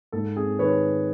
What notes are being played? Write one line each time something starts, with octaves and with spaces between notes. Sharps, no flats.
G#2 A4
C4 G#4
D#3 B4 C#5